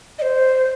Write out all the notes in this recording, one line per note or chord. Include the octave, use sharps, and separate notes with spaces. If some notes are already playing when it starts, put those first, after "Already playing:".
D#5
C5